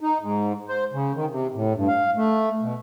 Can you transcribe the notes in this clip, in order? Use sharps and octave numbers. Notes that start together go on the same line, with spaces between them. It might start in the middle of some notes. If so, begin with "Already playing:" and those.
D#4
G#2
C5
C#3
D#3
C3
A2
G2
F5
A3
B2